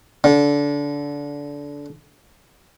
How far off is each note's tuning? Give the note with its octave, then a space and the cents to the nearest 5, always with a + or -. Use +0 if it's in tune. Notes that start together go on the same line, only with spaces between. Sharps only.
D3 -20